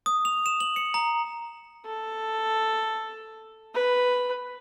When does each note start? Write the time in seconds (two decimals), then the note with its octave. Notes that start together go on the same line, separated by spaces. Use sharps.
0.06 D#6
0.25 F7
0.46 E7
0.60 F#7
0.76 C#7
0.94 A#5
1.85 A4
3.74 B4